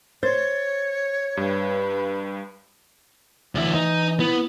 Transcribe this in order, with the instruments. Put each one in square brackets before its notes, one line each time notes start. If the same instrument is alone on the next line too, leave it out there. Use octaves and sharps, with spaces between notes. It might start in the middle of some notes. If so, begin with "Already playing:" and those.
[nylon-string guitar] C5 [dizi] C#5 [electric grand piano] G6 A6
[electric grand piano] G2 [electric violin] B4
[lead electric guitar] D2 E4 [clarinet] E3
[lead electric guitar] D#4
[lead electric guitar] B3 [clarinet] E4